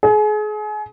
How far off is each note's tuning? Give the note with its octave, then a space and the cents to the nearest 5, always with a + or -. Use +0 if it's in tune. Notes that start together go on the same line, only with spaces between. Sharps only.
G#4 +35